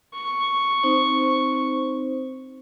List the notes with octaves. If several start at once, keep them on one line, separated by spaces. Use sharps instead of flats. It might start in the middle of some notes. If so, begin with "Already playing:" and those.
C#6
C4 D#4 C5